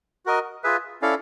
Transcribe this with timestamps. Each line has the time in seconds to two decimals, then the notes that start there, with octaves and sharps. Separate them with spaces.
0.26 F#4 A#4 D#5
0.64 F4 G#4 B4 E5
1.02 C#4 E4 A4 D5 F5